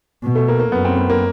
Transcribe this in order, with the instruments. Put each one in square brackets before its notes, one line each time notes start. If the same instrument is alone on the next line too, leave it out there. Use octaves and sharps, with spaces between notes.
[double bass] B2
[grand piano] A3
A#3
A#3
[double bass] F#2 [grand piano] B3
[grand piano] C4
B3
A#3